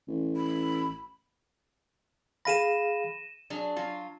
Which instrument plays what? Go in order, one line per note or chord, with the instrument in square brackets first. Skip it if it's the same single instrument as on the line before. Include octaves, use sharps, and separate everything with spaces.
[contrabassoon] A1
[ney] B5
[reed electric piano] G#4 F5 B5 [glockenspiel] A#6 D#7 E7
[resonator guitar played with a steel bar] F#3 D4 G#4
F#3 F4